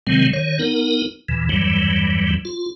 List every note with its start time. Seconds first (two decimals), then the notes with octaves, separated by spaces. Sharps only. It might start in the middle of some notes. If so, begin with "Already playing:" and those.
0.07 C3 D#3 F#3 G#3 C4
0.33 D#3 C#5
0.59 B3 D#4 A#4
1.29 E2 A#2 E3
1.49 E2 G2 E3 F#3 G3
2.45 F4